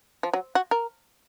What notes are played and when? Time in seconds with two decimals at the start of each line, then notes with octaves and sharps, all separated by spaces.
0.23 F3
0.33 F#3
0.55 F#4
0.71 A#4